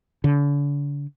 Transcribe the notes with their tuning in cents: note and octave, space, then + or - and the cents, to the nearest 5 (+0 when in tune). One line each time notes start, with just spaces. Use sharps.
D3 -40